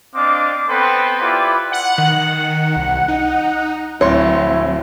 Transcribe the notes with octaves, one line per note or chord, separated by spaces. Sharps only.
C4 D4 D#5 F5 D6
B3 C4 A4 B4 C6
E4 F4 G4 B4 D5
F#5
D#3
C2
D#4
D1 F#3 C4 E4 C#5 C6